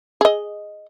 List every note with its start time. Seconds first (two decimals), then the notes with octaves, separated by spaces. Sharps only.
0.21 G#4 D#5